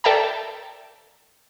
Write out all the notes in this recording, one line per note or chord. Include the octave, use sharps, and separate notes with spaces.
A4 D5 E5 G5 A5 A#5